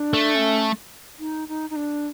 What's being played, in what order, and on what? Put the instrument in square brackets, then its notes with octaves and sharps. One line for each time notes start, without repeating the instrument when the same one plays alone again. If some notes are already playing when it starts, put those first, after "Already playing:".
Already playing: [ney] D4
[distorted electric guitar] A3
[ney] C#4
D#4
D#4
D#4
D4